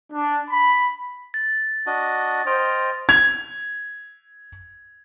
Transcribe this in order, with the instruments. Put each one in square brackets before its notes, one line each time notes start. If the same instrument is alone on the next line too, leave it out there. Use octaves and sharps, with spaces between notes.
[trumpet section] D4
B5
[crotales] A6
[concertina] D4 F#4 D#5
[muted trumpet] C5 [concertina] D#5 G5 F6
[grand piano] G#6 F7